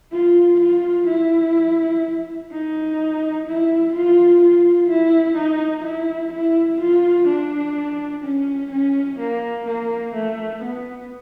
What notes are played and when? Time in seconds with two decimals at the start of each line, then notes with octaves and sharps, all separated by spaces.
0.12 F4
0.60 F4
1.08 E4
2.51 D#4
3.47 E4
3.94 F4
4.42 F4
4.90 E4
5.37 D#4
5.85 E4
6.33 E4
6.81 F4
7.28 D4
8.24 C#4
8.72 C#4
9.20 A#3
9.67 A#3
10.15 A3
10.62 B3